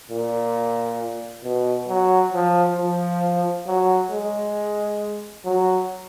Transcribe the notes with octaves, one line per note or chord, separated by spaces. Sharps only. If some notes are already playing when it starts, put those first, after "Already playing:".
A#2
B2
F#3
F3
F3
F#3
G#3
F#3